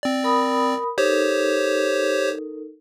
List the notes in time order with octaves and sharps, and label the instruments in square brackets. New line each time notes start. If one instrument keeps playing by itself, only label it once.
[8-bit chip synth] C4 D5
[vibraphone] A#4 B5 D#6
[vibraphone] D#4 A4 A#4 [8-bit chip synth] G4 C5 C#5